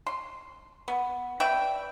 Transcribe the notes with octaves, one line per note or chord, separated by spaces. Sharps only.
C6
B3
B4 D5 E5 G5